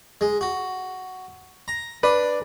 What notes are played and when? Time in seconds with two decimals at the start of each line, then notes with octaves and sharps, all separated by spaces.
0.21 G#3
0.41 F#4
1.68 A#5
2.03 D4 B4 D5